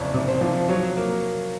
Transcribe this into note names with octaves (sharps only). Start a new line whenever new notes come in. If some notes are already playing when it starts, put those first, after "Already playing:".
Already playing: F#1 F2 F3 C#5 D5
C3
C5
F3
F#3 C#5
A#3